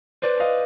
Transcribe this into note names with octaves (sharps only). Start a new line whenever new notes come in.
B4 C5 D5
D#5 F5